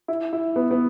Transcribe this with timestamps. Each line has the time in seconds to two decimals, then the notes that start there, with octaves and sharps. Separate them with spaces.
0.08 E4
0.33 E4
0.56 B3
0.71 B3